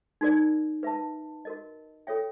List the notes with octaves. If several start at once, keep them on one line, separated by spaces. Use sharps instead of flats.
D#4 F#4 A#4 D5
B4 E5 A5
F#4 A#4 D#5
F4 A4 C#5 E5 G5